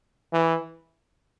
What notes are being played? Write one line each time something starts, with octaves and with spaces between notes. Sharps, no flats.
E3